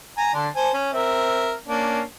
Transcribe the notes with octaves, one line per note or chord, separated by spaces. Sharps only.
G#5 A#5
D3 D4 C6
C5 G#5 A5
C#4
C4 A#4 E5
A#3 C#4 D4